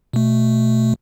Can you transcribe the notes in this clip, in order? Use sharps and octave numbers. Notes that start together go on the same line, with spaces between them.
B2 A3